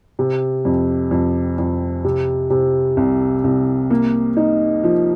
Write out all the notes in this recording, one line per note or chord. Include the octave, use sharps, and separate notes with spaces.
C3
F2
F2
F2
C3
C3
C2
C2
A#3
D#4
F3